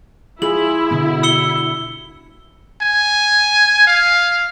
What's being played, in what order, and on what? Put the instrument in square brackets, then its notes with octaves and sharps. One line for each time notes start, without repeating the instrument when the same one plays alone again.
[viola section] E4 [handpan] F4 G#4 [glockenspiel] F#7
[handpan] B2 D3 B3
[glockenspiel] E6 C#7 G7
[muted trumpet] G#5
F5